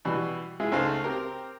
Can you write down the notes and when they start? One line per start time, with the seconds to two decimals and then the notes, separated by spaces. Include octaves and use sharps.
0.05 B2 E3 G3
0.60 G#3 E4 F4 G#4
0.72 C#2 A3 D#4 C5 F5 A5
1.04 C4 G4 A#4